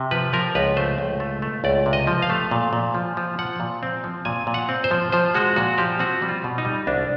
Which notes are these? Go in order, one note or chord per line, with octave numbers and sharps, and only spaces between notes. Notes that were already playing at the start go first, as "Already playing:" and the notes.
Already playing: C3
F3 B4
F3 A#4
C#2 B4
A3 C5
C#2
A3
A3
C#2 D5
C3
D#5
F3
F5
A3
A#2
A#2
F3
F3
F3 F#5
A#2
C4
F3
A#2 G#5
A#2
F#5
C4
C5
F3
F3 C5
G#3 F#4
A#2 F#4
F3 G4
C4 F#4
G3
F4
B2
D#4
G3
C2 D4